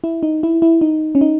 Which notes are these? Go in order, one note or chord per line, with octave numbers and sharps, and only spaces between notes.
E4
D#4
E4
E4
D#4
C#4
D#4